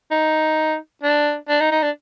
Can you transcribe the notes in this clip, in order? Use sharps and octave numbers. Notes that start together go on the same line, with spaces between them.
D#4
D4
D4
D#4
D#4
D4